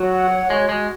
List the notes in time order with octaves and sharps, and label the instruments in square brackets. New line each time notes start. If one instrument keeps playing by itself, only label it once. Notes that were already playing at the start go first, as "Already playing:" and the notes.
Already playing: [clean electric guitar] F#3 [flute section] F#4
[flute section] F#5
C#5
[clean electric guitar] G#3 [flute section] F#4
[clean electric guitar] G#3 [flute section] F#4